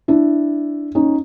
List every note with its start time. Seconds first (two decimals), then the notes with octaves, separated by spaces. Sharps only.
0.08 D4 E4
0.95 C#4 D#4